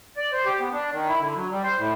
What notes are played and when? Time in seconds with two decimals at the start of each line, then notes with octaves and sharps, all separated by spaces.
0.17 D5
0.33 C5
0.46 G4
0.60 B3
0.72 D4
0.92 D#3
1.09 E4
1.20 D3
1.35 F#3
1.51 G3
1.63 C5
1.78 A2